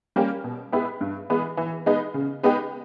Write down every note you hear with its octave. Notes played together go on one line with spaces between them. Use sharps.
G3 A#3 C#4 G4
B2
G#3 B3 E4 G4
G2
E3 G#3 B3
E3
G#3 B3 D#4
C#3
G#3 B3 D#4 G4